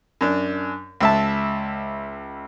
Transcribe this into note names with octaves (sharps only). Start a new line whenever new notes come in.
F#2 D4
C#2 E5 A5